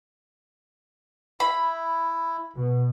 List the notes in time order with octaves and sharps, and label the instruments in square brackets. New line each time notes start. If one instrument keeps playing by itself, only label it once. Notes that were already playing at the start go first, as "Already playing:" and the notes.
[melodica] E4 [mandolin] B5
[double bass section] B2